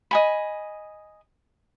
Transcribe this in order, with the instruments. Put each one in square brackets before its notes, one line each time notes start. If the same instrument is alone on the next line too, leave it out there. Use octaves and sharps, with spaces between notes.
[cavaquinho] D#5 G#5 B5